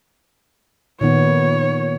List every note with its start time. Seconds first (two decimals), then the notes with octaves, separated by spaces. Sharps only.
1.01 A#2 D#3 B3 C#5